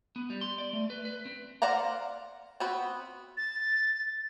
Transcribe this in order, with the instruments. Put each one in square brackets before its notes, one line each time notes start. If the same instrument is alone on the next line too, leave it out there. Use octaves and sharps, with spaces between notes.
[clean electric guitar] B3
G3
C6
D5
A3
B4
B4
C4
[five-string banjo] C5 D5 F5 F#5 A#5
B3 C4 F#4 B5
[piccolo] A6